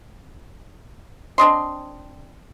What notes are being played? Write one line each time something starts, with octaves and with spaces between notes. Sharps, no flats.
C4 D4 D#5 C6